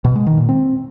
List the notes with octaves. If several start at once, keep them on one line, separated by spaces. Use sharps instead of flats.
B2
G#3
D#3
A#2
C4